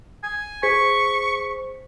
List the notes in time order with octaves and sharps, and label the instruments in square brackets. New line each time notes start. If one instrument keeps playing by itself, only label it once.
[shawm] G#5
[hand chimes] G#4 C5 B6 [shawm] C#6